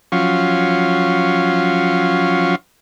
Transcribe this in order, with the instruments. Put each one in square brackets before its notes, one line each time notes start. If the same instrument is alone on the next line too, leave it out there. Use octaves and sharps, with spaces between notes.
[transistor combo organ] F3 F#3 C#4 F4